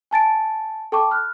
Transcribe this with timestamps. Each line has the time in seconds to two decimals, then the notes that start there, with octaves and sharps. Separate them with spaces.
0.11 G#5 A5 A6 D7
0.92 A4 G5 A5 C#6 D6
1.10 B5 F6 F#6